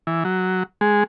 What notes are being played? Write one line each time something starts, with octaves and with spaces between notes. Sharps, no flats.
E3
F#3
G#3